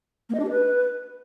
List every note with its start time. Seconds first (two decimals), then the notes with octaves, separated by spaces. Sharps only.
0.29 A#3
0.34 D#5
0.40 D4
0.45 G4
0.50 B4